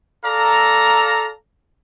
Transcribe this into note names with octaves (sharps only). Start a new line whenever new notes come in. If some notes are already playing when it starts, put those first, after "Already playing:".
A4 D5 F5 A#5